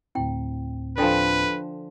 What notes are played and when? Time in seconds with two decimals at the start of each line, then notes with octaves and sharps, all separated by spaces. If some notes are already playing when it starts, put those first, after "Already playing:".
0.15 D2 A2 C4 E4 G5
0.98 D3 F3 A4 B4 G5 G#5